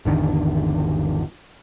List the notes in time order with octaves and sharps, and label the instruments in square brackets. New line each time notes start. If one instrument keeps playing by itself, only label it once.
[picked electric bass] G#1 E2 D3 D#3